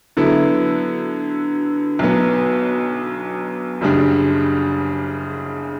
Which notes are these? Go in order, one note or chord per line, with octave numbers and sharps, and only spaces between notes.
D3 F#3 B3 E4 A4
B1 B2 F#3 B3
F#1 F#2 C#3 G3 D4